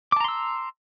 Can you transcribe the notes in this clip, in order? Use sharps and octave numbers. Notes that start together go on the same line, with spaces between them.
A5 A#5 C6 D6 E6